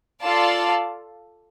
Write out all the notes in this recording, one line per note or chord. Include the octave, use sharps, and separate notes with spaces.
F4 A4 D5 F5 A5